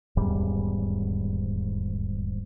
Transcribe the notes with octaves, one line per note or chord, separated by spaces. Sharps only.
D#1 E2 G#2 G3